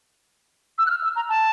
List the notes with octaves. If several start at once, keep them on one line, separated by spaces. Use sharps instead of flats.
E6
F#6
F6
E6
A#5
A5